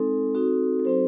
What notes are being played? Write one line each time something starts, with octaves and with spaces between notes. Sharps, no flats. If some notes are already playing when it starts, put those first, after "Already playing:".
Already playing: G#3 C4 D#4 A4
C4 D#4 F#4
A4
F#3 C4 D#4 F#4 C5